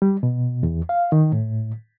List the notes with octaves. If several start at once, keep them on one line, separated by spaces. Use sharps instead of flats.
G3
B2
E2
F5
D#3
A2